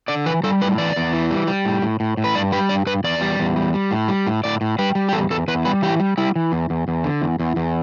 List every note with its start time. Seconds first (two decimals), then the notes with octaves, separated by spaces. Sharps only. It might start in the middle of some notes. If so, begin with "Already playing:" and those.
0.08 D3 D5
0.26 E3 B4
0.43 G3 A4
0.61 A2 B4
0.78 E3 D5
0.96 E2
1.13 E3
1.31 G3
1.47 G3
1.65 A2
1.82 A2
2.00 A2
2.17 A2
2.24 B4
2.35 G2 D5
2.52 G3 B4
2.69 G2 D5
2.86 G2 B4
3.04 E2 D5
3.21 G3
3.39 E2
3.56 G3
3.74 G3
3.91 A2
4.08 G3
4.27 A2
4.44 A2 D5
4.61 A2
4.79 G3 B4
4.95 G3
5.09 G4
5.13 E2 A4
5.30 E2 A4
5.48 E2 B4
5.65 G3 B4
5.82 E3 G4
6.00 G3
6.18 G3 E4
6.36 E3
6.52 E2
6.70 E2
6.88 E2
7.04 D3
7.22 E2
7.40 E2
7.56 E2